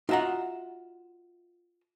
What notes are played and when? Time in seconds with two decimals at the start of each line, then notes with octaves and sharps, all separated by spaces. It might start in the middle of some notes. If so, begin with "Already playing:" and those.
0.09 D#4 F4 F#4 E5 F#5 A#5